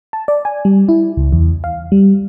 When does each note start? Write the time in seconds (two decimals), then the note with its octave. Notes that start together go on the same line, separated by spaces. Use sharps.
0.13 A5
0.28 D5
0.45 G#5
0.65 G3
0.89 E4
1.17 C#2
1.32 E2
1.64 F5
1.92 G3